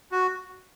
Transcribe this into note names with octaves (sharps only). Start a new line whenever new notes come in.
F#4